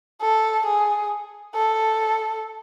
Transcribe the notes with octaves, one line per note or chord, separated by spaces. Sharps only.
A4
G#4
A4